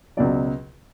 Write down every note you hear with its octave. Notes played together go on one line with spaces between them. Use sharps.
C#2 B2 F#3 D5